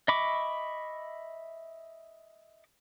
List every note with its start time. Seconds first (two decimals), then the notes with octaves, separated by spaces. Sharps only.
0.08 D#5 E5 B5 C#6 D6